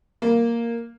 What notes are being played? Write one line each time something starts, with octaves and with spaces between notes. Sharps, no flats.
A#3